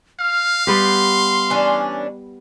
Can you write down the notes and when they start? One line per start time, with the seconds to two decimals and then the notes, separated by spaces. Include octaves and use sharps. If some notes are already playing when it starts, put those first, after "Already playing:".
0.20 F5 F6
0.67 G3 B3 G4 C6
1.50 E3 C#4 D4